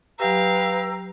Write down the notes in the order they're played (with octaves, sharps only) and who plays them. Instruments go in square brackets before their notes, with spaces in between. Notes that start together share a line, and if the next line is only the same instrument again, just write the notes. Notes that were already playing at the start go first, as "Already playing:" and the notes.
[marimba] F#3 G4 [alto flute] B4 [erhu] F5 [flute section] G5 A#5 E6